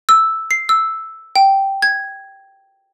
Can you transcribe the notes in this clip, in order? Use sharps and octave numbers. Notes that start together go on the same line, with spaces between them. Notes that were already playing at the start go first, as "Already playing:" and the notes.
E6
C7
E6
G5
G#6